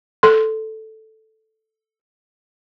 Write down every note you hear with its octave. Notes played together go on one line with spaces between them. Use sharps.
A4 C6